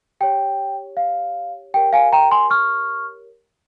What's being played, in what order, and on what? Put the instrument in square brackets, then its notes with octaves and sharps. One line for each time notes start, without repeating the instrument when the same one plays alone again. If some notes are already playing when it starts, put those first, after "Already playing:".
[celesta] G4 C#5 G5
F5
G4 A#4 C#5 G5
F5 G#5
G5 A#5
G#5 C6
C#6 F6